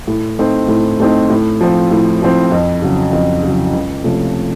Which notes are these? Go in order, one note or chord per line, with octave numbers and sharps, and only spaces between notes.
A2
A3 C4 D#4
A2
A3 C4 D#4
A2
F3 C4
A2
F3 C4
F2
C#3 F#3
F2
C#3 F#3
C#2
C3 F3 A3 C#4